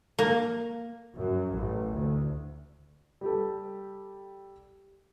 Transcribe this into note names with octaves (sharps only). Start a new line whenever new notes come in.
A#3
F#2
A1
D2
G3 G4 A4